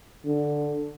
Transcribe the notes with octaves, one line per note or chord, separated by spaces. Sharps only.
D3